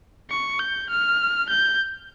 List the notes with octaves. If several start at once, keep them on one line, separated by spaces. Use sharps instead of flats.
C#6
G6
F6
G6